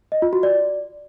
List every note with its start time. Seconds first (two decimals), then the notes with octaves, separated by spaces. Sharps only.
0.12 D#5
0.22 F4
0.33 F#4
0.43 D5